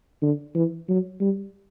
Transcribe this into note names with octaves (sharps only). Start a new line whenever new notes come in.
D3
E3
F#3
G3